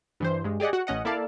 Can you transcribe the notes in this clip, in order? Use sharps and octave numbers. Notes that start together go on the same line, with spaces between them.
G2 E3 C5
G2 G#3
G4 G#4 D5 D#5 F#5
F#4 F#5
A1 C#4 D#5 F#5
A#3 E4 A4 D5 F5 A5